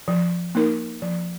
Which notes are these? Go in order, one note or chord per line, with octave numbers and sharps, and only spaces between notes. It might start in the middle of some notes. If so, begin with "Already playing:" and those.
F3
A#3 D#4 A#4
F3